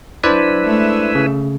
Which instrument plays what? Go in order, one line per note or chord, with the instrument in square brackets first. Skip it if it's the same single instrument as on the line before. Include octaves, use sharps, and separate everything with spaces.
[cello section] F#3 [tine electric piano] D4 C5 D5 [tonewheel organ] E4 B4
[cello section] G#3 A3 E5
[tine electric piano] C#3